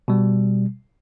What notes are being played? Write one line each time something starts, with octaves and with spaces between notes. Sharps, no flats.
B2 G3